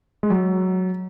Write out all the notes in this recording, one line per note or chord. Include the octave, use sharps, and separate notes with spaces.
G#3
F#3